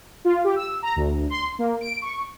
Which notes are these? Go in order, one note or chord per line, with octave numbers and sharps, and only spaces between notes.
F4
G4
E6
A#5
D2
C6
A#3
D7
C#6